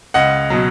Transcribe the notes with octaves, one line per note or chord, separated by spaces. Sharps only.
C#2 D#5 F#5
B2 F#3